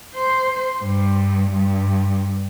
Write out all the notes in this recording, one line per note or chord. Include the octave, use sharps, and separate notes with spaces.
C5
G2
G2